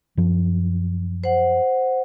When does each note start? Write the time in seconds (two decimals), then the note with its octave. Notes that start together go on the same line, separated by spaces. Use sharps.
0.17 F#2 F3
1.24 C5 F#5